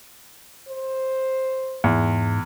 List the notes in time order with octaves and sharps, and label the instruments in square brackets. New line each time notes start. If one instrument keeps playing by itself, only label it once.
[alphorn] C5
[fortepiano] E2 [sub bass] G#2